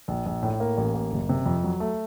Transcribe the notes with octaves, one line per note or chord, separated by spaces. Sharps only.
A#1
A#1
A2
A#3
A1
A#3
F#1
C3
F2
F#3
A3